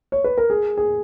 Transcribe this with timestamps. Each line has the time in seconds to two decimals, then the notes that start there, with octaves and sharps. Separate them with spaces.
0.12 C#5
0.24 B4
0.38 A#4
0.50 G#4
0.77 G#4